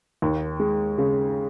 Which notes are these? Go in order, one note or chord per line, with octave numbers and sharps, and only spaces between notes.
D#2
G#3
C#3